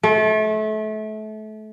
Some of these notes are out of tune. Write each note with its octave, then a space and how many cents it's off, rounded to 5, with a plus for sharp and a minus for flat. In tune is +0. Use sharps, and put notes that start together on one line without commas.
A3 -30